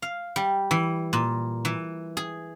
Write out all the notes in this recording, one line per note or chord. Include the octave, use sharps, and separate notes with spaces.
F5
G3
E3
A#2
E3
G#4